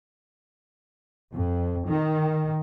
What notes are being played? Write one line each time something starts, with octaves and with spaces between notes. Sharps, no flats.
F2
D#3